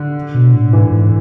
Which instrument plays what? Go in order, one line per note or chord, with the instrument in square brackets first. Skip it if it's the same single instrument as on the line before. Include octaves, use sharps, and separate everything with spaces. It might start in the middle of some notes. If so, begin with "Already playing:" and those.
Already playing: [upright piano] D3
[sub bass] B2
A2
[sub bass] G#2 [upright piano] E3
[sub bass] G#2